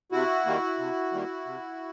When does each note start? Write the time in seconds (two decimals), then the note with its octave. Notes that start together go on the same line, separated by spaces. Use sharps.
0.12 C3 E4 F#4
0.46 D#3 G3 A#3
0.78 C3
1.12 D#3 G3 A#3
1.46 C3